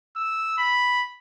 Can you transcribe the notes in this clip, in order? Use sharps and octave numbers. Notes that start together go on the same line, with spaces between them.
E6
B5